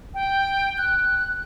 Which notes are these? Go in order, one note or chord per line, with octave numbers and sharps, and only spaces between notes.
G5
F#6